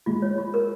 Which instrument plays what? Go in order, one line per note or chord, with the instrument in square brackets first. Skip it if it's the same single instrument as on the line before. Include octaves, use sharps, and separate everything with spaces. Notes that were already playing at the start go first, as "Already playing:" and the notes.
[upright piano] G#3 [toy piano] F4
[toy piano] C#5
F4
A#4